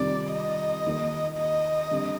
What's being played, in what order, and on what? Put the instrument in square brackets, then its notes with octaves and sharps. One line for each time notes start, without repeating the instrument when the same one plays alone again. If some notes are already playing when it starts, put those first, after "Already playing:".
Already playing: [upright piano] F2 C3 D#3 G3 [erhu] D5
[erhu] D#5
[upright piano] D#2 D#3 A#3
[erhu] D#5
[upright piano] D3 G3 C4